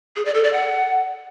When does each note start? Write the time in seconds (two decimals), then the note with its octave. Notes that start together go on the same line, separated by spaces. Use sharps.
0.16 G#4
0.25 D5
0.35 A4
0.44 D5
0.53 F#5